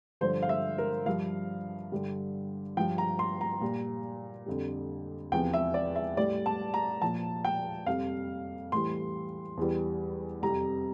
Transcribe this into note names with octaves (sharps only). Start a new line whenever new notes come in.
G2 D3 F3 C5
F5
E5
A#4
G2 F3 F5
G2 D3 G3
G2 F3 G5
A#5
C6
A#5
A#2 G3
F2 D3 G3
E2 C3 F3 G5
E5
D5
E5
A2 G3 D5
A5
A#5
A#2 F3 A5
G5
F2 C3 G3 F5
A2 E3 G3 C6
E2 E3 G3
F2 C3 G3 A#5